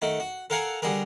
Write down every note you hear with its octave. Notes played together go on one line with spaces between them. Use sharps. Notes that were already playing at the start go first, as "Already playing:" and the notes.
D#3 A3 F#4
F#4
A4 A#4 F5 F#5 G#5 A#5
D3 G3 F#4 G#4 A#4